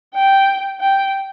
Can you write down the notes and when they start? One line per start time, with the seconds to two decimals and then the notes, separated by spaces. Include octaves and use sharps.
0.15 G5
0.81 G5